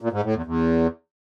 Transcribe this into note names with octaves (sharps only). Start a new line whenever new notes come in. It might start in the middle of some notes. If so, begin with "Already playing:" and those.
A#2
G#2
A2
E2
E2